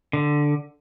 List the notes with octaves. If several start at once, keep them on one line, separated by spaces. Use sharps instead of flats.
D3